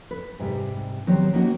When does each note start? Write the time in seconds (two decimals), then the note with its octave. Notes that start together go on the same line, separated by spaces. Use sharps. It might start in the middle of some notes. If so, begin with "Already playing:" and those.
0.11 B4
0.40 G#2 C3 G3
1.07 D#3 F#3 G3 B3 C4
1.33 A#3 C#4 D#4 F#4